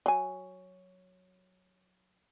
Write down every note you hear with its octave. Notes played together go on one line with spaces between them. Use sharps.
F#3 G#5